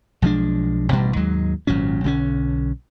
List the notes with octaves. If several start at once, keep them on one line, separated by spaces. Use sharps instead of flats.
B1 F3 G#3 D4
A1 G2 B2 G3
D#2 G#2 F#3 G#3
G#1 A#2 F#3 C#4
B1 D3 C4 C#4